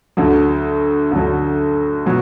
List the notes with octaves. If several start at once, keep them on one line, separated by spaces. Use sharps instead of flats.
D2 D3 F#3
D2 D3 F#3
B2 F#3